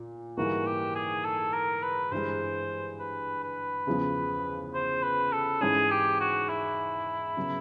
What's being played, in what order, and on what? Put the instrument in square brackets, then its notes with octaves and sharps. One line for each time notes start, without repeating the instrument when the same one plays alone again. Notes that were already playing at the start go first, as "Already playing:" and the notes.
Already playing: [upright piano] A#2
[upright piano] G#2 E3 G3 A#3 [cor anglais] F#4
[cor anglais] G4
G#4
A4
A#4
B4
[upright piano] G2 E3 G#3 [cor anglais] C5
[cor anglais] B4
B4
[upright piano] E2 C#3 F3
[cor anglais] C5
B4
A4
[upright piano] G#2 E3 G#3 C#4 [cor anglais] G#4
[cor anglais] G4
F#4
E4
[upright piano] C#3 F#3 B3